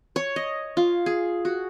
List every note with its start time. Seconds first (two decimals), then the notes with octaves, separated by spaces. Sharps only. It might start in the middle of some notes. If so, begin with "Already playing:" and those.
0.16 C#5
0.36 D#5
0.77 F4
1.06 G#4
1.45 F#4